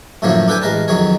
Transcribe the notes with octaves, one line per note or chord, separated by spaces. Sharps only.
F#2 A2 D3 F3 A#3 C#5
D4 A4 B4 G5 G#5
A1 G#3 A#4 B4 A5
F2 D#3 F#3 G#4 C#5